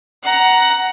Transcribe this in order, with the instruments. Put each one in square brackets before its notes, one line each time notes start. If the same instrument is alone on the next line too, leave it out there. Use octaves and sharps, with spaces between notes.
[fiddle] F#5 A#5